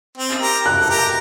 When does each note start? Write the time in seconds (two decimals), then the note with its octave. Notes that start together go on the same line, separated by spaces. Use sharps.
0.17 C4
0.41 G4 A#4
0.66 F#6
0.80 A4
0.89 G4 A#4